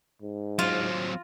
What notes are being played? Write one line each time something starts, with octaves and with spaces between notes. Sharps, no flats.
G#2
F#3 C4 F4